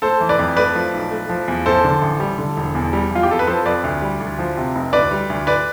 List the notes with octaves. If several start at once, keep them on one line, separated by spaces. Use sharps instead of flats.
A3 A4 C5
E3
B4 D5
F2
A3 B4 D5
F3
B1
A3
F3
E2
A1 A4 C5
D3
A1
G3
D3
E1
E2
G3
E2 F4
G4
F2 A4
B4
F3 A4 C5
F2 B4 D5
D2
G3
D2
F3
C3
F1
D2 B4 D5
G3
D2
B4 D5